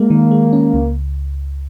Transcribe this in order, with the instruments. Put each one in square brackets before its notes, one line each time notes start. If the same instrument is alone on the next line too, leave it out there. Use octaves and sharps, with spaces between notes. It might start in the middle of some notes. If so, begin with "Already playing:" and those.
Already playing: [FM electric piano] G#3 [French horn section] A#3
[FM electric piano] D#3
G#3
C#4
C#2